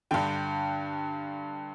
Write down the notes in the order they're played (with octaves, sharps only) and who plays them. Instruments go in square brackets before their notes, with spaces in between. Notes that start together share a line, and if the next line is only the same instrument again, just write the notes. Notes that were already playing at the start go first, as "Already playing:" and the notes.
[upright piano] G2 D3 G5